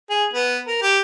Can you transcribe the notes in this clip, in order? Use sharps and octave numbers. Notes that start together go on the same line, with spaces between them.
G#4
B3
A#4
G4